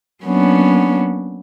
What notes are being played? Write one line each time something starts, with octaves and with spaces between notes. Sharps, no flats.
F#3 A#3 B3 C#4 D4